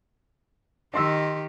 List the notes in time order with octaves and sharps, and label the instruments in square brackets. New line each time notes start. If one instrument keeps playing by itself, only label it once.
[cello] D#3 G4 [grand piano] D#5 C6 E6